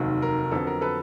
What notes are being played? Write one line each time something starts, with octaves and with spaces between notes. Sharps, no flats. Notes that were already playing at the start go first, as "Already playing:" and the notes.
Already playing: F1 D#2 D#3 F#3
A#4
F2 D3 F#3 B3 A4
A#4
A4 B4